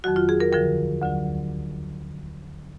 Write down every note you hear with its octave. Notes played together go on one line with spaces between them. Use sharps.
F2 D#3 F#3 F#4
F4
G#4
A#4
D#2 D3 F3 A#4
D2 D3 F#3